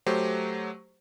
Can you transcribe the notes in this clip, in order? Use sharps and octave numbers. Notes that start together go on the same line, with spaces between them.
F#3 A3 G4 C5